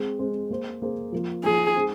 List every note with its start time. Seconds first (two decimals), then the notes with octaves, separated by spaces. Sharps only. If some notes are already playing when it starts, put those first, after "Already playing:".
Already playing: G#3 C4 G#4 C5
0.19 G#3 C4 G#4 C5
0.50 A#3 G#4 C5
0.82 A#3 G#4 C5
1.12 F3 A#3 F4
1.43 F3 A#3 F4 G#4
1.75 G#3 D#4 G#4 C5